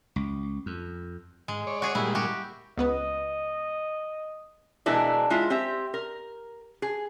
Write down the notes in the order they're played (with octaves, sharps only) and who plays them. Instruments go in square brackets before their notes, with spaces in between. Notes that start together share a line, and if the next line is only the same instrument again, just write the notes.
[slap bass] C#2
F2
[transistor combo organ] G#2 [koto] G#3
[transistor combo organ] C#5 D5
[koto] F#4 G#4
[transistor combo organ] A#2 G3 G#3 [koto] E4
[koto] F#4 G4
[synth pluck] C#2 B3 B4 [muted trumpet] D#5
[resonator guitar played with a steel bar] B2 E3 G#3 D4 E4 A#4
G#3 E4 F4
C4 G4 E5
A#4
G#4